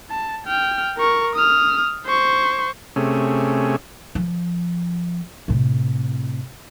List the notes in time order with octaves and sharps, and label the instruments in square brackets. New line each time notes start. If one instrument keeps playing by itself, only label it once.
[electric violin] A5
G5 F6
A#4 C#6
D#6 F6
C5 C#6
[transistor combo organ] C3 A3 C#4 G#4
[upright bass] F3
A2 C3